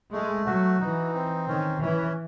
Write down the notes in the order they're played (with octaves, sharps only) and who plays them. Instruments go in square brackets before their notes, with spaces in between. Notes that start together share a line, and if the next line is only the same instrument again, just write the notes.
[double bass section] G#3 [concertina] A3
[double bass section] F#3 [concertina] F#4
[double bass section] E3 [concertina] D#4
[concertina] C4
[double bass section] D#3 [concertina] C#4
[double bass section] E3 [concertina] C#4